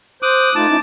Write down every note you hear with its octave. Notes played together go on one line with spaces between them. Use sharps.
C5 D6 D#6 F#6
A3 D#4 F4 A5 D6
C#4 D#4 E4